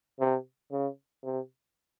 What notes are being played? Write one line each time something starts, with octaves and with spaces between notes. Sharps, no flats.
C3
C#3
C3